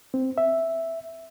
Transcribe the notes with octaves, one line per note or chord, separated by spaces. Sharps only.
C4
E5